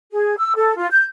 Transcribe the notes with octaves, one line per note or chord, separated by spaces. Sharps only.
G#4
E6
A4
F4
G6